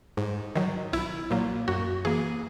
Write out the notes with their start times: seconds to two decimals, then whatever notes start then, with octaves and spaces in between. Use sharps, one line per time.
0.17 G#2
0.56 D#3 F#3
0.93 B1 E4
1.31 A#2 F#3 A#3
1.68 F#2 F#4
2.05 E3 A#3 G#4